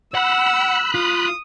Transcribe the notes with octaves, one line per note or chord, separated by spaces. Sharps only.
F#5 B5 E6 F#6
F4 D#6